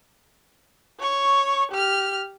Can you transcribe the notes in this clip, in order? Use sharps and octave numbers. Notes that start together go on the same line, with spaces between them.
C#5 C#6
G4 F6